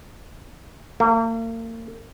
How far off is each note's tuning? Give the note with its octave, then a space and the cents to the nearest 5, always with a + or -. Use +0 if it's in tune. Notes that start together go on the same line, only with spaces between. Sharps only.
A#3 -40